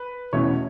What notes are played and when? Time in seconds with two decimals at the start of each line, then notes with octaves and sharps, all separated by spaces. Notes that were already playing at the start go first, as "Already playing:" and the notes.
Already playing: B4
0.33 E2 B2 A3 C#4 C#5